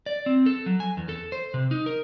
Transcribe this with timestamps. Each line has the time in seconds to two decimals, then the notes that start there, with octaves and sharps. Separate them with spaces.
0.06 D5
0.26 C4
0.46 A4
0.66 F#3
0.80 G#5
0.97 E2
1.09 A4
1.32 C5
1.54 C3
1.71 D#4
1.86 A#4